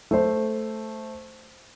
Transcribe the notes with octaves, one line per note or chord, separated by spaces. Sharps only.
A3 C5